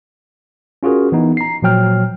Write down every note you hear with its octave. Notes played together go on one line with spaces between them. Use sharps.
C#4 F4 F#4 G#4 A#4
E3 B3 D#4
A#5 C7
A#2 F3 F#3 G5 F6